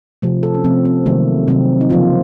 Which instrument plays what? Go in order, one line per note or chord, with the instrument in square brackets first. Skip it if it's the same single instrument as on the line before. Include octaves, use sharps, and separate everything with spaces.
[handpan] C3 F3 A3
A4
C#4
C3 F3 A3 C4
C4
C3 D#3 F#3 A3 A#3
C3 D#3 F#3 A3 C4
D#4
C#3 F3 A#3 F4